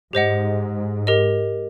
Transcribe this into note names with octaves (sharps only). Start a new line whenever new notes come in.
G#2 G4 C5 D#5 F#5
G4 A#4 D#5